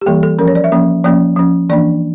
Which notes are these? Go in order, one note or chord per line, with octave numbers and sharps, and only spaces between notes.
G4
E3 G3 A#3 A4
A4
F3 C#4 A#4
C#5
D5
E5
F3 A#3 C#4
F3 A#3 C#4 D5
F3 C#4
E3 A#3 D4 D5